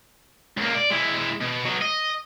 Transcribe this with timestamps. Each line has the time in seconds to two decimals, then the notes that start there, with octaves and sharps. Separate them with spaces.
0.58 C#2 A#3
0.75 D5
0.91 G#3 E4
1.41 B2
1.65 F#3 B3
1.82 D#5